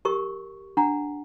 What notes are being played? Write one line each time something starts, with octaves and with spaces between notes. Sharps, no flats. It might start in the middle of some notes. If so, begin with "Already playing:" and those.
G4 A#4 C#6
D4 F#5 A#5